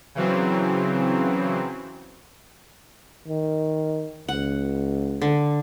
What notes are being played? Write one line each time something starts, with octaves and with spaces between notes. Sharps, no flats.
C#3 E3 F#3 C4
D#3
C#2 F#5
D3